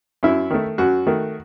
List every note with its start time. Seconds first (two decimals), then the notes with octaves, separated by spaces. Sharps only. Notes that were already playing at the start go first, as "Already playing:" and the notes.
0.23 F#2 E4
0.51 D#3 A3
0.78 F#2 F#4
1.07 D#3 A3